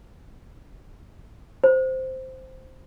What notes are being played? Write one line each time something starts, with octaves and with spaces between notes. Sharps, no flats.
C5